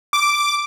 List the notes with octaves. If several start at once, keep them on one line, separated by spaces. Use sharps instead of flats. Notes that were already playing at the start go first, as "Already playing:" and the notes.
D6